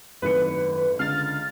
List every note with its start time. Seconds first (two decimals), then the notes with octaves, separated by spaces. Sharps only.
0.22 G#1 F#2 A2 D#3 B4 C#7
0.99 C#2 D3 F6 A6 C7